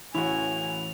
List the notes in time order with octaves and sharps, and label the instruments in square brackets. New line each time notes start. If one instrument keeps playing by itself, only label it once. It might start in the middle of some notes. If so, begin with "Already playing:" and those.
[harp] A1 [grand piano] E4 F#4 [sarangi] G#5 [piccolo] F7